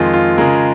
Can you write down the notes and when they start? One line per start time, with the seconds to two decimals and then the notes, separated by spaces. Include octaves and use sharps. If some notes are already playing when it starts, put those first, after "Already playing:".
Already playing: F2 D#3 G#3 F4
0.13 F4
0.38 C#3 G#3 F4 A#4